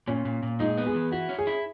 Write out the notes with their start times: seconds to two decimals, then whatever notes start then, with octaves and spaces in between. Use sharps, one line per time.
0.07 A#2 C#4
0.25 A#2
0.43 A#2
0.60 G#3 D#4
0.78 B3
0.87 G#4
0.95 E3
1.12 E4 F#4
1.29 C#4
1.39 G#4
1.47 E4